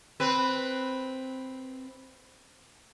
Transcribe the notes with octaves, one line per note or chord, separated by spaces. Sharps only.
C4 B4